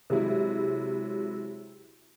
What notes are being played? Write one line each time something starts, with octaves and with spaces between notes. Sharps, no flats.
C3 F#3 G#3 E4